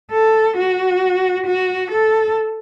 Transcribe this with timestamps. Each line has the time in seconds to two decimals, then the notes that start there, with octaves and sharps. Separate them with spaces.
0.11 A4
0.57 F#4
1.46 F#4
1.91 A4